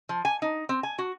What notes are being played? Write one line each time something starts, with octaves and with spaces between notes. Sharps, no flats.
F3
G#5
D#4
C4
G#5
F#4